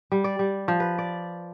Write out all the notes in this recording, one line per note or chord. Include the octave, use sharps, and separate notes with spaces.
G3
D5
G3
F3
B4
D5